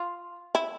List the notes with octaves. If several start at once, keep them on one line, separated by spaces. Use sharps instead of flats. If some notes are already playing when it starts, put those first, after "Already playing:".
Already playing: F4
E4